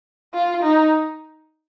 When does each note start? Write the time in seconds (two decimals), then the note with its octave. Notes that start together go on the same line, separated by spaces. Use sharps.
0.34 F4
0.63 D#4